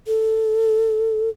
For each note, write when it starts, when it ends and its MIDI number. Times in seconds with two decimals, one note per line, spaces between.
0.07 1.30 69